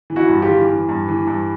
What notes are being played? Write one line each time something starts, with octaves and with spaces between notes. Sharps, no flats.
E3
E4 F#4
G2
F4 G4
E3
E3
G2
E3
G2